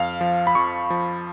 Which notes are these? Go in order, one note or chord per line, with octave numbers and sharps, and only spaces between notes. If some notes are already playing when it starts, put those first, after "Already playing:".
Already playing: F2 F5
F3
B5
F2 C#6
F3